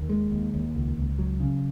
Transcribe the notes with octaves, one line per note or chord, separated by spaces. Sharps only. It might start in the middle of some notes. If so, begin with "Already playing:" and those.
Already playing: D#2
G#3
D#2
D#2
C#2
C#2
F#3
C#3